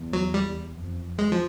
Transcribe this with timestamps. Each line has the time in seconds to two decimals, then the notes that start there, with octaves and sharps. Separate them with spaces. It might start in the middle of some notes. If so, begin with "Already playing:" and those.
Already playing: E2
0.13 F#3
0.34 G3
0.76 F2
1.18 G#3
1.32 F3